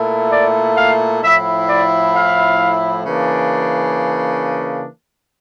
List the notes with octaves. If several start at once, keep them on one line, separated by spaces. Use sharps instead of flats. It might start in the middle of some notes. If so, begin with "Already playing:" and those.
Already playing: A#2 A3 E4
D5
F5
A2 F3 A3 E4 E5
D5
F5
C#3 E3 A#3 D4